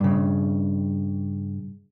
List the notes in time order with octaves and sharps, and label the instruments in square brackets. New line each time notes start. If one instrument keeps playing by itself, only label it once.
[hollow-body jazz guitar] G2 C#3